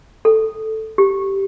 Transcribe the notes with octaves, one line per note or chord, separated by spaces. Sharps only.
A4
G4